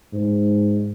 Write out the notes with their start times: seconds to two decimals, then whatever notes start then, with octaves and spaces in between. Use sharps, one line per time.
0.13 G#2